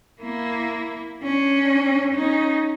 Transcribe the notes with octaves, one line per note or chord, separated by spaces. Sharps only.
A#3 E4
C#4 D4
C#4 D#4